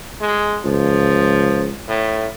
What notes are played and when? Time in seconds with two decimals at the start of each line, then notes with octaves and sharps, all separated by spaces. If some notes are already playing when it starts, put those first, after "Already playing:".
0.21 G#3
0.65 C#2 F3
1.88 A2